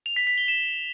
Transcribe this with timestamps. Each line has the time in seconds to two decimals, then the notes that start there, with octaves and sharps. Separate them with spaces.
0.06 F7
0.16 B6
0.27 B6
0.38 G7
0.48 E7